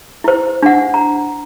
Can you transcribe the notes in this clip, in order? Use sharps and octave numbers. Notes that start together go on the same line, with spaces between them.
E4 C5
D4 F#5
A#5